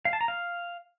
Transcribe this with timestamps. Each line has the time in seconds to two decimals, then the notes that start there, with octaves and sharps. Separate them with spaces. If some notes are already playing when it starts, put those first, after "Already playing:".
0.05 F5
0.13 A5
0.21 A#5
0.28 F5